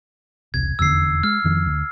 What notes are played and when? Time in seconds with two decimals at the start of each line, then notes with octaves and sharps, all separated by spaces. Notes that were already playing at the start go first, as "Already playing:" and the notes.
0.54 E1 C2 G#6
0.79 F1 E2 D3 E6 C7
1.23 G#3 F6
1.44 F2 D#3 F3
1.66 D2